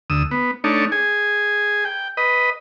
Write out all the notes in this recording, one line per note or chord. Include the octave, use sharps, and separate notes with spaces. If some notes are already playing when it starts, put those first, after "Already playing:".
D2 D#6 E6
B3
A3 D4 D#4 C#5
G#4 G#5
G5
B4 D#5